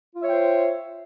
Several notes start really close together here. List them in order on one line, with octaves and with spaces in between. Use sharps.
F4 E5 C#5 G5 C5